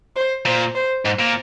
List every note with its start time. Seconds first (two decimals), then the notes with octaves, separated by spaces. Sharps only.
0.16 C5
0.45 A#2 C5
0.75 C5
1.05 G#2
1.19 A#2